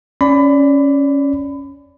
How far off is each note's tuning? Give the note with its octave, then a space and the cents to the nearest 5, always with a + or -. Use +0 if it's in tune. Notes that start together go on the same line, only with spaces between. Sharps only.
C#4 +0 D5 -10 B5 +25